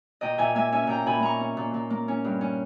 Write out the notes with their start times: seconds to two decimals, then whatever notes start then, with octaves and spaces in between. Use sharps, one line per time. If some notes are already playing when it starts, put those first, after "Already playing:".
0.21 A#2 D#5 G5
0.38 A#2 E5 G#5
0.55 A#3 E5 G#5
0.72 C#4 E5 G#5
0.87 A#2 G5 A#5
1.06 A#2 G#5 B5
1.20 A#3 A#5 C#6
1.40 C#4
1.57 A#2
1.74 A#2
1.90 A#3
2.08 C#4
2.24 G2
2.41 C#4